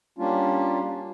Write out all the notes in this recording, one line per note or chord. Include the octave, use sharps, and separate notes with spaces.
G3 A#3 C#4 D4 F4